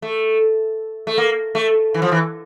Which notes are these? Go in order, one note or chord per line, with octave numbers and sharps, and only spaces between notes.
A3
A3
A#3
A3
E3
F3
E3